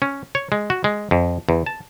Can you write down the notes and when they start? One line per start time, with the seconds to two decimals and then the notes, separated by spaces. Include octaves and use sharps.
0.02 C#4
0.35 C#5
0.52 G#3
0.70 F#4
0.84 G#3
1.11 F2
1.49 E2
1.66 A5